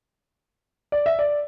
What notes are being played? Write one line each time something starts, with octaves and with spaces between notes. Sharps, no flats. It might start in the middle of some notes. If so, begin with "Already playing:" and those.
D5
E5
D5